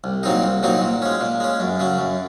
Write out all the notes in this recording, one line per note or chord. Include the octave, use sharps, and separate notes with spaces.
C2
A#2 F#3 C4 D#4
C2
A#2 F#3 C4 D#4
A#2
G#3 C#4
A#2
G#3 C#4
F#2
C#3 F#3
F#2